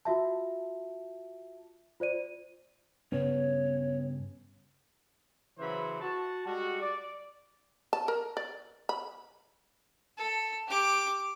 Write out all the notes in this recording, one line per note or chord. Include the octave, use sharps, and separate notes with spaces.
F4 F#4 E5 A5
F4 C5 D5 D#7
G2 C#3 B3 C#5
C#3 E3 F#3 C5 B5
F#4 A5
G3 G#3 F#4
D5
A5
A#4
D5
B5
A4
G4 D6